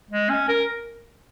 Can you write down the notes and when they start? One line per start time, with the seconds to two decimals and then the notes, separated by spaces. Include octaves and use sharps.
0.11 G#3
0.30 C#4
0.49 A#4